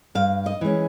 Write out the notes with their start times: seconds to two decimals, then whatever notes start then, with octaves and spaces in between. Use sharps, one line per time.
0.15 G2 F5
0.46 D#5
0.61 E3 G#3 C#4